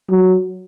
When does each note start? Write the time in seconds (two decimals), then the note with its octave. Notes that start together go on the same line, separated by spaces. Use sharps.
0.10 F#3